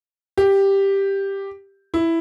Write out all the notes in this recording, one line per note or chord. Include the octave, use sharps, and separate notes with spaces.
G4
E4